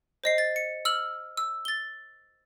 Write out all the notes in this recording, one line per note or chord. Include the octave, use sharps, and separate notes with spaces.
C5 D#5 C7
A6
C#7
E6 F6 F#7
E6
A6 G7